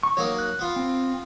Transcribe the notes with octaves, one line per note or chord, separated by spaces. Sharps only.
C#6
F#3 A#3 D#4 C#5
F#6
B3 F4
C4